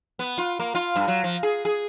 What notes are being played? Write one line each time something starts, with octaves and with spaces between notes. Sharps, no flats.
B3
F4
A#3
F4
G2
F#3
F3
G#4
G#4